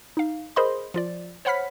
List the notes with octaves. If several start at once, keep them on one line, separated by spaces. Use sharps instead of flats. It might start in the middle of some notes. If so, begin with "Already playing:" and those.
D#4 F5
G#4 A#4 C5 D#5 B5 C6
F3 F4 D5
C5 C#5 F#5 B5 F6 B6